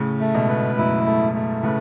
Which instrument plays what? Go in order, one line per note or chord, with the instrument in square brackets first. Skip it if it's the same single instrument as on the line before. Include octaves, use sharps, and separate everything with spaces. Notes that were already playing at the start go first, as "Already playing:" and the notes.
Already playing: [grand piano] A2 C#3
[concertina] A3
[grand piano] G#2 B2
[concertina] B4
[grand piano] F#2 A2 [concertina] E4
[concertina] A3
A3
[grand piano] A2 C#3 [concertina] B4